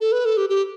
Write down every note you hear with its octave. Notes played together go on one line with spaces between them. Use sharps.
A4
B4
A4
G4
G4